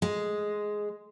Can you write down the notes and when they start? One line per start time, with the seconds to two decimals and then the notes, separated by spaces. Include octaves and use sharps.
0.02 G#3